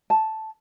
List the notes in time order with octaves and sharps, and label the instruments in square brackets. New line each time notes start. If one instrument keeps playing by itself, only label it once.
[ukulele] A5